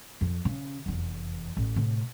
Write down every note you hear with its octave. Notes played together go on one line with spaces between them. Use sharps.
F2
C#3
F1 E2
A1
A2 C3